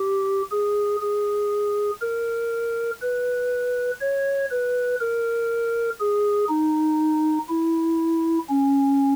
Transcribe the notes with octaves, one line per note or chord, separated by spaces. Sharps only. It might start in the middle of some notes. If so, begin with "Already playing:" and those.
Already playing: G4
G#4
G#4
A#4
B4
C#5
B4
A#4
G#4
D#4
E4
C#4